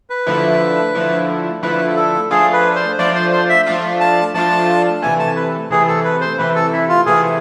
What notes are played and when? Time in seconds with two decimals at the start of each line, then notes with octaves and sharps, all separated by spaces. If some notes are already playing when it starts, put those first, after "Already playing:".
0.10 B4
0.27 D3 F3 A3 E4
0.95 D3 F3 A3 E4
1.63 D3 F3 A3 E4 B4
1.96 A4
2.31 F3 A3 D4 F4 G#4
2.53 B4
2.76 C5
2.99 F3 A3 D4 F4 D5
3.15 C5
3.32 C5
3.49 E5
3.66 F3 A3 D4 F4
4.00 A5
4.34 F3 A3 D4 F4 A5
5.02 C3 E3 A3 G#5
5.19 A5
5.36 B4
5.70 C3 E3 A3 G#4
5.88 A4
6.05 B4
6.21 C5
6.38 C3 E3 A3 B4
6.55 A4
6.73 E4
6.89 F4
7.06 C3 E3 A3 G#4